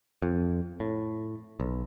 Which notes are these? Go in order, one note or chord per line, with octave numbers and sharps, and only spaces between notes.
F2
A2
B1